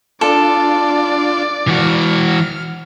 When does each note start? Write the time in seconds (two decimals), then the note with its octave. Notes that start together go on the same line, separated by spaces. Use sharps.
0.21 D4 F4 A4 D5
1.68 E3 F#4 F6